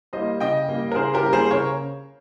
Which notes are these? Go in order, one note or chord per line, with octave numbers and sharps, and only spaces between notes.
G3 A#3 C5 D#5
C#3 D#5 G5
G3 A#3
A#4
C#3 G#4 C5
G4 A#4
G3 A#3
G#4 C5
C#3 A#4 C#5